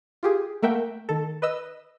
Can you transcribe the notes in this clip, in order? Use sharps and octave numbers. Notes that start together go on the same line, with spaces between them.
F4 G4 G#4
A3 A#3 A#4 E5 F#5 G5
D#3 A4
B4 D#5 E6